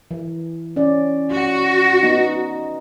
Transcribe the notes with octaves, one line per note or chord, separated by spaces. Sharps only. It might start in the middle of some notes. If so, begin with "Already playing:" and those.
E3
C#4 D5
F#4
B3 D#4